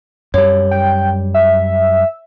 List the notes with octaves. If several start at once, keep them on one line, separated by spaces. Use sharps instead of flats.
F#2 G3 C#5
G5
E5